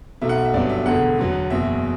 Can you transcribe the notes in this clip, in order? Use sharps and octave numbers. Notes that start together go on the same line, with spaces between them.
B1 B2 A3 E5
F#5
E5
G1 G2 F#3 B3 D5
E5
E1 E2 D3 A3 F#5
E2 D3 F#3 B3
F#1 E2 B2 F#3 E5